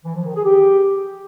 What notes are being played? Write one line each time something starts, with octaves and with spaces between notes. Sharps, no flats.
E3
F3
D#3
G#4
G4